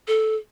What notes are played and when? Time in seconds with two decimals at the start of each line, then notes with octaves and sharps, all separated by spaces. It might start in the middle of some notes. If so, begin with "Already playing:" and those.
0.08 A4